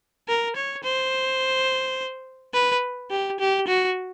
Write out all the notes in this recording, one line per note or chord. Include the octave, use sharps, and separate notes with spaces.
A#4
C#5
C5
B4
G4
G4
F#4